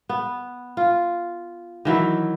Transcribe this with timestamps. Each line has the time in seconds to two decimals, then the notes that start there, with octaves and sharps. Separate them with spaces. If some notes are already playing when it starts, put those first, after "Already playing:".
0.09 B3
0.77 F4
1.85 D#3 E3 F#3 E4